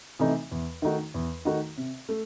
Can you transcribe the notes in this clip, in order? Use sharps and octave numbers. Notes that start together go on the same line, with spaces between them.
C3 E3 A3 D#4
E2
D#3 A3 D#4 F#4
E2
D#3 A3 D#4 F#4
C3
A3